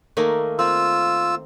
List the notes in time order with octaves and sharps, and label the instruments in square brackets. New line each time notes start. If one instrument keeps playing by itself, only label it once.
[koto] D#3 A3 A#3
[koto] C4 [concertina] F4 E6